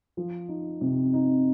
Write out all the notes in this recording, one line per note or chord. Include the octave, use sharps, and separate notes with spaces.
F3
D#4
C3
D#4